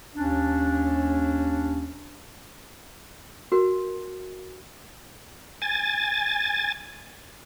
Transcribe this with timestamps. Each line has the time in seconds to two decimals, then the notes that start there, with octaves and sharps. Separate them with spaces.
0.15 D#2 C#4 D4
3.52 F#4 A#4
5.62 G#5 A6